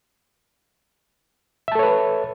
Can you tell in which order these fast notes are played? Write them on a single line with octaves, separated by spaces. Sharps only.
E5 A5 A4 C#5 B4